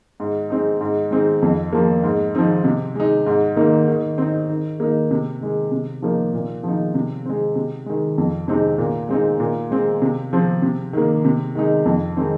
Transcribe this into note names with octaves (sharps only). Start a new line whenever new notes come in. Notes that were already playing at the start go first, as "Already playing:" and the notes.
G#2
G#3 C4 D#4
G#2
G#3 C4 D#4
F2
F3 A#3
G#2
F3 C4 D#4
C3
G#3 D#4
G#2
D#3 A#3 D#4
D#3
C4 D#4
D#3
A#3 D#4
C3
D#3 G#3
C3
F3 A#3 D#4
A#2
F3 C4 D#4
C3
G#3 C4
C3
D#3 G#3
F2
C3 G#3 C4 D#4
A#2
G#3 C4 D#4
A#2
G#3 C4
C3
F3 C4
C3
D#3 A#3
C3
D#3 G#3 D#4
F2
D#3 G#3 C4 D#4